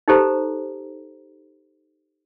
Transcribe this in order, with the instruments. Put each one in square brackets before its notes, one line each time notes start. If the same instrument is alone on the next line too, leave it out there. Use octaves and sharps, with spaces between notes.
[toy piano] D#4 G4 A4 C5 A#5